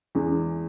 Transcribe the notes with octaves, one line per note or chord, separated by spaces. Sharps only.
E2 E3 G#3